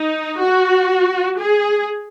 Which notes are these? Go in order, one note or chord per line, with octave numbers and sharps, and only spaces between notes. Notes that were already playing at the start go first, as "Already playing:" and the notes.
Already playing: D#4
F#4
G#4